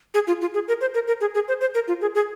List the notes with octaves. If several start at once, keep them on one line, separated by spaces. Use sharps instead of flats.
G#4
F4
F4
G#4
A#4
C5
A#4
A#4
G#4
G#4
C5
C5
A#4
F4
G#4
G#4